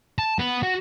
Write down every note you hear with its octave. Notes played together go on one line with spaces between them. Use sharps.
A5
B3
F#4